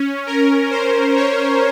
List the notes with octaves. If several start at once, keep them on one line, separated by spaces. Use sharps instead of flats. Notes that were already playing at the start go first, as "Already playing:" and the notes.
Already playing: C#4
A#4
C5
C#5